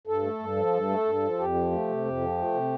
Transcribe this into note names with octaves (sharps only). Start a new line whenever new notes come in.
G2 A4
A3
G2
F3
G2
A3
G2
F3
F2 G4
F3
A3
C3
F2
F3
A3
C3